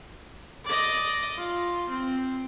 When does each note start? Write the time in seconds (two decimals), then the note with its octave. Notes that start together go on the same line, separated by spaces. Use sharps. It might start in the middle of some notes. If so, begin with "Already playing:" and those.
0.65 D5 D#5
1.37 F4
1.89 C4